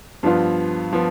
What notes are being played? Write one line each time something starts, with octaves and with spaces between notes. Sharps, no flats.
G2 F3 B3 F4
F3 B3